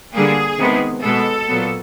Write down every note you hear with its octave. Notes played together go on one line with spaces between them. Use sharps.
D3 G3 A#3 G#4
C3 D#3 G#3 B3
B2 G#3 B3 A4
A#2 F#3 B3